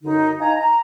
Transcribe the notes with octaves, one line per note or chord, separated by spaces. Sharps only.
F#2 D3 D#4
D#4 F5 G#5 A#5
A#5